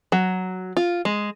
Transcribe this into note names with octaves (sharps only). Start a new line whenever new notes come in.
F#3
F4
G#3